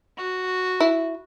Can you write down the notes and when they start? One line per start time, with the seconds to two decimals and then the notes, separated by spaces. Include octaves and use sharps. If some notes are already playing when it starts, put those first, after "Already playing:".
0.18 F#4
0.80 E4